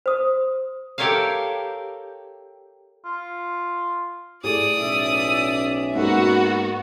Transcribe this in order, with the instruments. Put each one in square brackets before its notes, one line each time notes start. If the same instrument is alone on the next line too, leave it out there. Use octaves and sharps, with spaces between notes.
[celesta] C5 D#6
[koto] G4 A4 A#4 C#5 E5 F5
[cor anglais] F4
[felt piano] A2 G#4 A4 [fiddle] D5 D#6
[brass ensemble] B1 C#4 E5
[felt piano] G#2 A#3 [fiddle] B3 [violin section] F#4